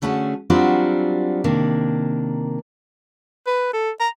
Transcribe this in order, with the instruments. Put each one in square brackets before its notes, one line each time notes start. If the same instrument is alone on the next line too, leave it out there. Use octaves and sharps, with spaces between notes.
[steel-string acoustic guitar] D3 A3 C#4 F#4 G#4
F#3 G3 C4 D4 F4 F#4
C3 D#3 A#3 D4
[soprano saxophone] B4
A4
A#5